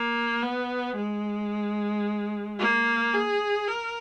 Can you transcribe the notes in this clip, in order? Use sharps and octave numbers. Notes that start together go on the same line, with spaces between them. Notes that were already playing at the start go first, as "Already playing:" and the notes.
Already playing: A#3
B3
G#3
A#3
G#4
A#4